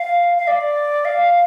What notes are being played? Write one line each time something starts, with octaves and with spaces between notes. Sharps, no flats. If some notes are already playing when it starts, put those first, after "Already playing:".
Already playing: F5
F5
D5
F5